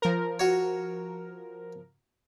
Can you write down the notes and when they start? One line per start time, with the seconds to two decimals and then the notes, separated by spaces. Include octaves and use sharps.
0.02 F3 A#4
0.40 F#4 C#5